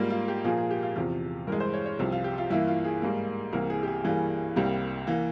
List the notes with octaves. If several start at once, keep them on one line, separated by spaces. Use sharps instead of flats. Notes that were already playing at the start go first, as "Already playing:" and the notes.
Already playing: G#2 G3 A#3 F4
F4
G4
A#2 F3 A#3 G#4
G#4
G4
F4
E2 C3 F3 F4
G2 E3 G#3 A#4
C5
C#5
C#5
C2 C3 F3
F4
G4
F4
G2 E3 A#3 E4
F4
G#4
G#2 G3 A#3
C2 C3 E3 A#3 A#4
G#4
G4
G#4
G2 E3 G3 A#3 G#4
C2 C3 G3 A#3 G4
E3 A#3